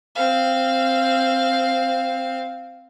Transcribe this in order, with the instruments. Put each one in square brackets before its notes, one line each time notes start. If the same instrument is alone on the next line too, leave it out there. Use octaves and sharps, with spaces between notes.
[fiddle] C4 F5